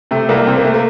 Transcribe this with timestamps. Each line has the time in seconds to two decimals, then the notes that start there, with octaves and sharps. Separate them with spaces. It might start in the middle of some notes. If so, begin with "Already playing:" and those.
0.11 C3 A3
0.29 C2 A#3
0.47 C3 C4
0.56 A#3
0.65 A3
0.74 A#3